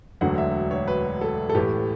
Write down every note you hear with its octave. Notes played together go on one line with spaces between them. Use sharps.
E1 D2 D3 F#3 F#5
E5
C#5
B4
A4
A4
A1 A2 E3 A3 G4